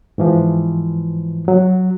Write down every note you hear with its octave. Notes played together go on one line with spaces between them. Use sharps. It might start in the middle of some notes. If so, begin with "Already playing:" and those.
G#2 E3 F3
F#3